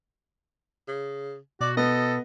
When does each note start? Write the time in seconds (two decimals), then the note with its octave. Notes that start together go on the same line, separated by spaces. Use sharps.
0.88 C#3
1.61 B2 F#4 D5
1.77 B3 A4 D#5